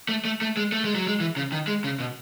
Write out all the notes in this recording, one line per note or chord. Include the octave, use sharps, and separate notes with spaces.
A3
A3
A3
G#3
A3
G#3
F#3
G#3
E3
C#3
D#3
G#3
C#3
B2